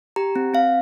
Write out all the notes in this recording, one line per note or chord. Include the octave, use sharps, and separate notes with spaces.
G4 A#5
C4
C4 F5